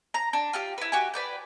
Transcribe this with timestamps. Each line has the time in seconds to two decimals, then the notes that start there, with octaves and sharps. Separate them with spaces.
0.14 A#5
0.33 D4
0.53 F4 G4 F5
0.78 E4 B4
0.92 F#4 G4 G#5
1.14 B4 D5 G5